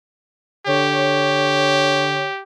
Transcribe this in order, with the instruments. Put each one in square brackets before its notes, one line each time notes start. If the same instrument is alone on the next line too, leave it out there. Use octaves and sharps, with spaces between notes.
[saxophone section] D3 C#5 [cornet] G4